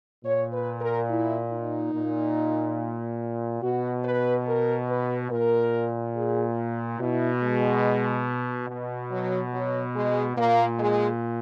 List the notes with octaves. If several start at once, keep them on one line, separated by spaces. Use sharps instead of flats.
A#2 C#5
B4
A#4
E4
D#4
A#2
B2 F#4
B4
A#4
B4
A#2 A#4
G#4
B2 E4
G#3
B2
F#3
F#3
G#3
A#2 A#3
G#3